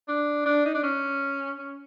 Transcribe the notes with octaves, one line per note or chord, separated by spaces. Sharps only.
D4
D4
D#4
D4
C#4
C#4